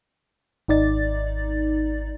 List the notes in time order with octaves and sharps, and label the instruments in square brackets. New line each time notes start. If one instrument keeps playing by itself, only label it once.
[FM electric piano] G#1 D#4 D5 A6